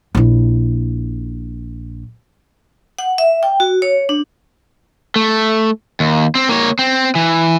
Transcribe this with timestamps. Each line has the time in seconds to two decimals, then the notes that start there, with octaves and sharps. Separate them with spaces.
0.15 A#1 E4
2.99 F#5
3.18 E5
3.43 G5
3.60 F#4
3.82 C#5
4.09 D4
5.16 A3
6.00 D#2
6.35 C4
6.49 A#3 C#5
6.79 C4
7.15 E3